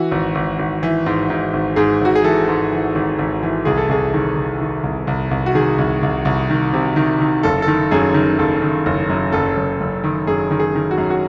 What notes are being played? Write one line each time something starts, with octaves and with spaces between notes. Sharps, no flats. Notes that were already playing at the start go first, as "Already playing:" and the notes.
Already playing: E3 F#4
G#1
G#1
G#1
E3
G#2
G#2
G#1
G#2 G#4
G#1 F#4
G#4
E3 A4
G#2
E3
G#1
G#1
E3
C2 G#4
A4
C2 G#4
D#3
D#3
D#3
C2
C2
C2
F#4
D#3 G#4
C2
C2
C2
D#3
C3
D#3
D#3
F#1 A4
A4
D#3
F#2 G#4
D#3
F#1 A4
D#3
F#1
F#2
F#1 A4
F#1
F#1
D#3
F#2 G#4
D#3
G#4
D#3
F#4
F#2
F#4